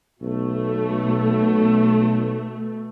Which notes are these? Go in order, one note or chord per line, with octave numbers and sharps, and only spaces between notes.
B1 B2 A3